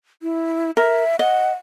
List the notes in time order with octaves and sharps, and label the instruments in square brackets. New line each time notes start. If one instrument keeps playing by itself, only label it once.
[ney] E4
[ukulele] A#4 [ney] E5
[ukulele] D#5 [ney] F#5